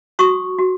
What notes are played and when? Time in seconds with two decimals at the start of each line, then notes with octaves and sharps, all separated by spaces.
0.19 F#4 C#6 D#6
0.59 F#4